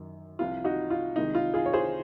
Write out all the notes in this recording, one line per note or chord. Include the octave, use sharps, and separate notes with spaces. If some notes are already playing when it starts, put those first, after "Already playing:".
Already playing: F#2 D#3
C2 C3 F3 F4
D#4 F#4
F4
C2 C3 D#3 G#3 D#4
F4
F4 G#4
C#5
G#4 C5